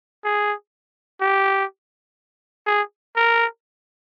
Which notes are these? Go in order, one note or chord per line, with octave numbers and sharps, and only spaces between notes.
G#4
G4
G#4
A#4